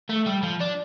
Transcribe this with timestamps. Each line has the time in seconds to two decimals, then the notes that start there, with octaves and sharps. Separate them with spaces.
0.09 A3
0.26 G3
0.43 F3
0.61 D4